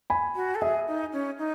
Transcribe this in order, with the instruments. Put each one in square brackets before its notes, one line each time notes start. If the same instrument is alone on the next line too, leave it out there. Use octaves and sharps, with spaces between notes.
[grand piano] G#5 B5
[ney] F#4
A4
[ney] G#4 [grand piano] E5 G#5
[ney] D#4
C#4
D#4